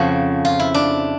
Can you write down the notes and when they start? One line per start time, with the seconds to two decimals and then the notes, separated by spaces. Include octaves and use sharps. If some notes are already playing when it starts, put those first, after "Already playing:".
Already playing: F2 C#3 F3 F#4
0.45 F4
0.59 E4
0.74 D4